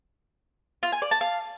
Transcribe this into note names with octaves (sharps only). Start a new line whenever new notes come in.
F4
G#5
D5
A5
F5